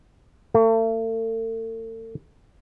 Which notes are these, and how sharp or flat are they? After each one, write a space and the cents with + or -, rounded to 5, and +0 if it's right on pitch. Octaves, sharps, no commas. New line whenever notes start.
A3 +40